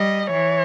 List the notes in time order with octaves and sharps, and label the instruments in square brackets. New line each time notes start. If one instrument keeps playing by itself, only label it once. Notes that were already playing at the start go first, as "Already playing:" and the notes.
Already playing: [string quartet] G3 [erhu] D#5
[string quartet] E3 [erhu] C#5